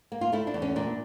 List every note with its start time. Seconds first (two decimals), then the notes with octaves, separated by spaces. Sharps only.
0.12 A#3
0.21 F4
0.32 A3 E4
0.47 D4
0.54 E2
0.62 C#4
0.76 A#2 D4